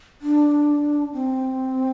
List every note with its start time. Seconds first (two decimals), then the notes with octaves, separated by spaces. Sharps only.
0.21 D4
1.13 C4